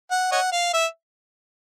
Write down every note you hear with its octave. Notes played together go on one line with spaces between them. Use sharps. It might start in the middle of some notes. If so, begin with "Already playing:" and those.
F#5
C#5 D#5 F#5
F5
E5